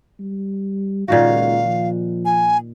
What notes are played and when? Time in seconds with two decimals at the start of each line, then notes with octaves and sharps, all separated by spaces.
0.19 G3
1.08 C#2 A#2 D#3 F#4 F5
1.65 F3
2.25 G#5